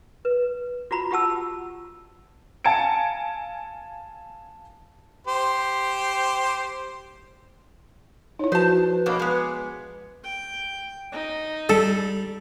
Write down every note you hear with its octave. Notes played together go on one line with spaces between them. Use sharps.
B4
F4 F#4 A#5 B5
F4 G4 F#5 A5 E6
F5 G#5 A5 G#6 C#7 D7
G4 C5
D#4 E4 C#5
F3 F#4 B4 C5 F5 A5
B2 A#3 D4 C#5 D#5 B5
G#3 B3
G5
D#4
G3 A4